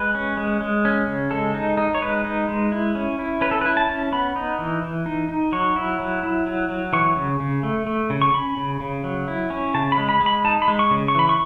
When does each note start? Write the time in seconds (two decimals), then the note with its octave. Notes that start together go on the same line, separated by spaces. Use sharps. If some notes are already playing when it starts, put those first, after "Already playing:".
Already playing: G#3 B4
0.15 C#4
0.37 G#3
0.61 G#3
0.85 C#4
1.07 C#3
1.31 G#3 A4
1.54 D#4
1.77 D#4
1.95 C#5
2.02 G#3 B4
2.25 D#4
2.49 G#3
2.72 E4
2.95 C#4
3.19 E4
3.41 C#4 B4
3.51 A4
3.61 E4 B4
3.77 A5
3.89 C#4
4.12 B3 B5
4.36 D#4
4.59 E3
4.82 E3
5.06 D#4
5.29 D#4
5.52 F#3 C#6
5.76 E4
6.00 F#3
6.23 E4
6.46 F#3
6.69 F#3
6.93 E3 C#6
7.16 C#3
7.40 C#3
7.63 A3
7.87 A3
8.10 C#3
8.22 C#6
8.33 C#4 B5
8.57 C#3
8.80 C#3
9.04 F#3
9.28 E4
9.50 C#4
9.74 C#3 A5
9.92 B5
9.98 G#3
10.09 B5
10.20 G#3
10.26 B5
10.45 D#4 A5
10.62 B5
10.68 G#3
10.79 C#6
10.91 C#3
11.08 C#6
11.15 E3 B5
11.29 C#6